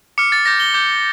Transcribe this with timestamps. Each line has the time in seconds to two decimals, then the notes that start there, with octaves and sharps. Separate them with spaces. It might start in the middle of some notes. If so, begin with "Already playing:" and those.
0.18 D6 F6 C#7
0.32 A6
0.46 D6 G6 A#6
0.60 G7
0.74 D6 G6